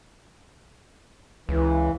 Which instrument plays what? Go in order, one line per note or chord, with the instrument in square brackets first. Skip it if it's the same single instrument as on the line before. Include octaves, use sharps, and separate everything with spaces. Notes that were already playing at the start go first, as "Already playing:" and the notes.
[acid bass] C#2 [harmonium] E3